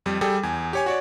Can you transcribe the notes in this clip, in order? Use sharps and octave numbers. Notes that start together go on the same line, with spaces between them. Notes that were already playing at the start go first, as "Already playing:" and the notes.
F2 G3
G3 G#4 A4 G5
E2 G#5
G4 C#5 G#5
F#4 C#5 D5